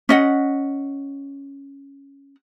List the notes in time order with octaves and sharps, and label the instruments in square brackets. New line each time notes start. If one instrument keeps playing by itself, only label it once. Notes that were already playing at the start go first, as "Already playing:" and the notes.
[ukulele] C#4 D#5 F#5